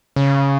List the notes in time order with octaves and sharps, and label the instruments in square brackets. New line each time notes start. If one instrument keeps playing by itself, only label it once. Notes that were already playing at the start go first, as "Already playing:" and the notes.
[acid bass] C#3